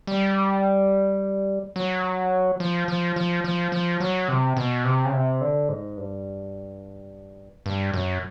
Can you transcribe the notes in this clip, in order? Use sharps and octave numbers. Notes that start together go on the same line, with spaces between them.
G3
F#3
F3
F3
F3
F3
F3
F#3
C3
B2
C3
C#3
C3
D3
G#2
G2
G2
F#2